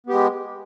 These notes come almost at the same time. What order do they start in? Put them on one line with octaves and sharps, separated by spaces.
B3 G4 G#3